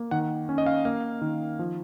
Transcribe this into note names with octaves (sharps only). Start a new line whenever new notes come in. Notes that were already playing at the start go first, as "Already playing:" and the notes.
Already playing: A#3
D#3 F#5
C#4
D#5
F5
A#3 F5
D#3
F3